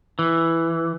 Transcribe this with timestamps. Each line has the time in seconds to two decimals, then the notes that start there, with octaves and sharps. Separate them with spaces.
0.19 E3